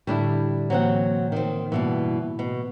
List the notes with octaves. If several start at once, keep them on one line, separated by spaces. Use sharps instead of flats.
A2 D3 G3 D4 E4
A2 E3 F#3 A#3 C4 F#5
D#3 C4
G2 B2 E3 A#3
B2